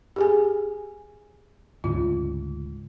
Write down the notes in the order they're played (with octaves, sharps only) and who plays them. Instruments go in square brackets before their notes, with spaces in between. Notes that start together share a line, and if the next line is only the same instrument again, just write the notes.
[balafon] G4 G#4 G#5
[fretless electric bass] D2 G#2 C#3 [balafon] F4